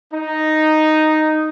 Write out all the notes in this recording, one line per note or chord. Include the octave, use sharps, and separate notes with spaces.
D#4